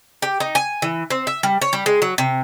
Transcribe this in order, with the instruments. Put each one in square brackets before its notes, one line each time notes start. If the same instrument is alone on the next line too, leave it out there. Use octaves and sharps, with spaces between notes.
[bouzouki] G4
D#4
G#5
E3
C4
E5
G3
C#5
G3
G#3
F#3
C3